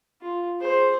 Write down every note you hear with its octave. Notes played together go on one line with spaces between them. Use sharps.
F4
G#4 C5